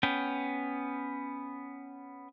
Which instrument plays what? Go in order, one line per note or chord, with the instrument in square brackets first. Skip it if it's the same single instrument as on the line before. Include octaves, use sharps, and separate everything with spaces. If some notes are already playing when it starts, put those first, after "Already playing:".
[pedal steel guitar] B3 C#4 G5